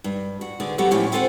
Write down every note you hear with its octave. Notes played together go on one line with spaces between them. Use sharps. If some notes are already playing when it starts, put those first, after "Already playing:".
G2
F#4
D3 B3 G#4 D5
F#3 B3 F#4 G4 A4
A2 F3 C#4 E4 G4 C#5
C4 F4 G#4 A4 C5 F#5